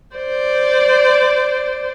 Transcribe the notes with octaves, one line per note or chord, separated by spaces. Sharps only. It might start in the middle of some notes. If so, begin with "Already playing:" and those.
C5 D5